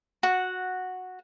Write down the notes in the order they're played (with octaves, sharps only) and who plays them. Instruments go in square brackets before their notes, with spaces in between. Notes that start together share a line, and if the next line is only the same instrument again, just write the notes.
[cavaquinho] F#4 F#5